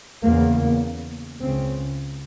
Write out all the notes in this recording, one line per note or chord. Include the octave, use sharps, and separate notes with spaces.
E2 C#3 A#3
C#2 C#3 C4